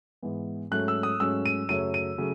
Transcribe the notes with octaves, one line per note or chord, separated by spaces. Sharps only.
G#2 E3 B3
G#2 F#3 A3 C#4 F#6
E6
D#6
G#2 F#3 A3 C#4 E6
D#7
F#2 C#3 F#3 A3 D#7
D#7
C#3 F#3 A3